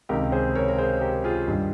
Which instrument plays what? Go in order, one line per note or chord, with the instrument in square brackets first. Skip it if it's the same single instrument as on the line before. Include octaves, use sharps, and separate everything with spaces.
[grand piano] C#2 C3 D#3 G4 A#4
G#4 C5
A#4 C#5
A#4
G#4 C5
G4 A#4
A#4
F4 G#4
G2 D#3 G3